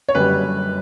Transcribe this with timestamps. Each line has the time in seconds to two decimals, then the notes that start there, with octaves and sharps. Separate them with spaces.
0.09 C#5
0.15 F#1 F#2 D3 G3 B4